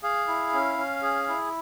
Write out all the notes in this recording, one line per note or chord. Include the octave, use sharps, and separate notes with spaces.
G#4 F5
E4
C#4
C#4
G#4
E4